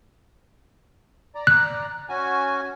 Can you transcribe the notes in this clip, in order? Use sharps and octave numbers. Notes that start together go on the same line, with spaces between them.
D5 A#5
F#6
C#4 F#4 G#5